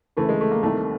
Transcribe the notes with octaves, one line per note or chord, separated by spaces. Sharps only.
D2 C#3 E3 A3
G#3
A3
A#3
C2 C3 D#3 A3